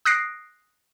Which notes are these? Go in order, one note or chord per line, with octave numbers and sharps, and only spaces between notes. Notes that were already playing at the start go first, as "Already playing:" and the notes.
D#6 F#6 A#6 C7 D7